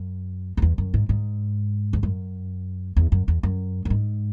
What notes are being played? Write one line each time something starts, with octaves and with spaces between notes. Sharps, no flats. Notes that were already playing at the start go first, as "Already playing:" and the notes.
Already playing: F#2
F#2
E2
F#2
G#2
G#2
E2
F#2
E2
F#2
E2
F#2
F#2
G#2